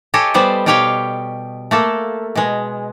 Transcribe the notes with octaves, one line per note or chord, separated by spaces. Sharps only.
G4 A4 C#5 D#5 G#5
G3 B3 C5 A5
B2 G3 G4 C#5 F5 G5
A3 A#3 A4
B2 G#3